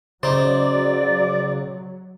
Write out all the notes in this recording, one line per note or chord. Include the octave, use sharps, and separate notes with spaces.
C#3 F#3 D#4 C5 D5